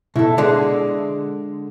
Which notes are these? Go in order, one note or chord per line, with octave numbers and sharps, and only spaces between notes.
B2 E4 A4
D3 G#3 D5